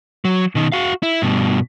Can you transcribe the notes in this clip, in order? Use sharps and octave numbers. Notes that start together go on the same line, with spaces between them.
F#3
B2 D#3
F#4 F5
E4
G2 B2